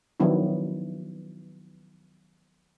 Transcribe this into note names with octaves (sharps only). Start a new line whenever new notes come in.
D#3 F3 F#3 B3 D4 E4